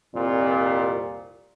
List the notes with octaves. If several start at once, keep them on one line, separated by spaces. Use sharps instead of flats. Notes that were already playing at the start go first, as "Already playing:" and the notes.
C2 F2 A#2